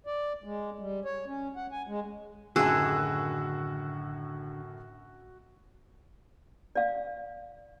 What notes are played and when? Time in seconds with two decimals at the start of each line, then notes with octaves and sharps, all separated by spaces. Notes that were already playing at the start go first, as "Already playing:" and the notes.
0.07 D5
0.44 G#3
0.79 G3
1.05 C#5
1.28 C#4
1.56 F#5
1.72 G#5
1.87 G#3
2.56 F#2 A2 D3 D#3 F#4 G#4 E6 F#6
6.75 D5 F5